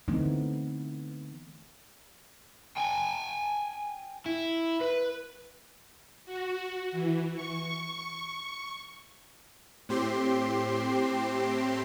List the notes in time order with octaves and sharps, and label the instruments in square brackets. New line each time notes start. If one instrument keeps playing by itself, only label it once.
[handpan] D3 E3 A3 B3 C4 D#4
[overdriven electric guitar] G5 G#5
E4
B4
[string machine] F#4
E3
C#6
[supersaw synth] A2 C4 G4 C6